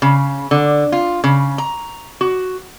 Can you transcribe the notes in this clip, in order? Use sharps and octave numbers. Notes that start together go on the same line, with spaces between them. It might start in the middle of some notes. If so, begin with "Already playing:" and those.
C#3
D3
F4
C#3
A#5
F#4